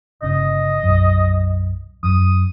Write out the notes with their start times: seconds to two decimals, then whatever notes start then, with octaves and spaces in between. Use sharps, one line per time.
0.22 G1 C#3 D#5
0.83 B1 F#2
2.03 F#2 D#6